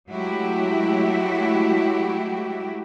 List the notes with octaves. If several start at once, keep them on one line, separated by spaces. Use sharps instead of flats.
F#3 G#3 A3 E4 F#4 G4